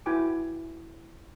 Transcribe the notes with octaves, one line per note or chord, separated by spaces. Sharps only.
E4 F#4 B4 G5 G#5 D6